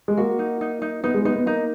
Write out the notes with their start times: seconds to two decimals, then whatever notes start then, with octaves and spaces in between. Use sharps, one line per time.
0.08 G#3
0.17 A#3 F#4
0.39 D#4
0.61 D#4
0.82 D#4
1.04 B3 D#4
1.14 G#3
1.25 B3 D#4
1.36 B3
1.46 A#3 D#4